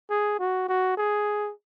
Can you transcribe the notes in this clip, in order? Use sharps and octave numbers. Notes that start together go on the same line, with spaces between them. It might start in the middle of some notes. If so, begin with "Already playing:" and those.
G#4
F#4
F#4
G#4